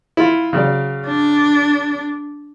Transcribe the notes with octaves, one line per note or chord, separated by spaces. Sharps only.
E4 F4
C#3 F#3 D5
D4